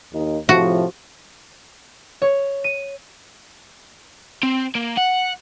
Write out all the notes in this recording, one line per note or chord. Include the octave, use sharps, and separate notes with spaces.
D#2 D#4
A2 C3 F3 F#4
C#5
D#7
C4
A#3
F#5